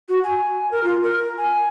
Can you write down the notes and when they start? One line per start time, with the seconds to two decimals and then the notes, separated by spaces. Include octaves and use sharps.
0.09 F#4
0.24 G#5
0.71 A#4
0.84 F4
1.03 A#4
1.38 G#5